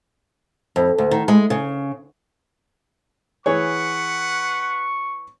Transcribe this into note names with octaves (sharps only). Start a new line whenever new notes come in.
F2
D2
D#3
G#3
C#3
E3 G#4 B4 C#5 F#5 C#6